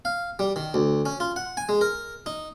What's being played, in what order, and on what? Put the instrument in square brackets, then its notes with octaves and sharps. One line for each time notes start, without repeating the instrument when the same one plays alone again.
[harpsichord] F5
G3
D#3
D2
C#4
F4
F#5
G#5
G#3
A#4
D#4